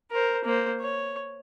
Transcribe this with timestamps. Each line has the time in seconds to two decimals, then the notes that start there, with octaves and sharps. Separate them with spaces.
0.11 A#4 C5
0.45 A#3 C5
0.80 C#5